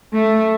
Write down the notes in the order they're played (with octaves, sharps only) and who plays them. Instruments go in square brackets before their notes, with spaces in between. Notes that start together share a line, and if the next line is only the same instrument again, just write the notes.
[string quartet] A3